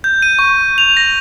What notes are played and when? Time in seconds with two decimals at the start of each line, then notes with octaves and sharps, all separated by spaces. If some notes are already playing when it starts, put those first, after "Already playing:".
0.04 G6
0.22 D#7
0.39 C#6
0.78 F7
0.97 A#6